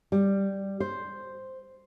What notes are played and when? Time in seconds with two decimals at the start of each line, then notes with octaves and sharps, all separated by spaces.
0.12 G3
0.80 C5